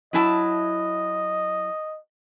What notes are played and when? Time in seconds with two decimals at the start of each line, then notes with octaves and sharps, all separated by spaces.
0.13 F#3 E4 D#5 A5